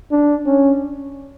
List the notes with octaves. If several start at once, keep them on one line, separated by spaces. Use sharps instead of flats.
D4
C#4